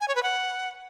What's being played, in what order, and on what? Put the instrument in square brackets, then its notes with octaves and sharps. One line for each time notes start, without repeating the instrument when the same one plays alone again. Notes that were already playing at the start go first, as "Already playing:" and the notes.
[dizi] G#5
C#5
B4
F#5